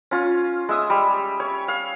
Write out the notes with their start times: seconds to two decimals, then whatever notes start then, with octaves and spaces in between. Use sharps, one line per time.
0.11 C#4 F4
0.69 G#3 E5 D#6
0.90 G3
1.40 C#5
1.68 F5